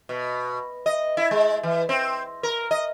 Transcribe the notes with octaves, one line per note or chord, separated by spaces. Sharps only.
B2
D#5
E4
G#3
E3
C4
A#4
D#5